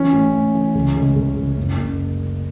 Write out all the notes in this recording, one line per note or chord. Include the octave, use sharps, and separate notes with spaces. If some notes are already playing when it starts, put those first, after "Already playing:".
Already playing: E3 C#4
A1
A1
E3
C#2
C#2
C#2
C#2
F#1
F#1